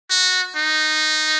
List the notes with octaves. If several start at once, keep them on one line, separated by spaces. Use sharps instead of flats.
F#4
D#4